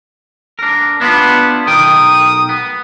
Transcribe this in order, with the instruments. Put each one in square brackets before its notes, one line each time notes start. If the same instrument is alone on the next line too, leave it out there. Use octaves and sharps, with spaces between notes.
[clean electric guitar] D4 A#4
[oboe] B3 [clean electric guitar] D4 E4 F4
[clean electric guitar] B1 A#4 G5 [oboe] D#6
[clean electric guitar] B3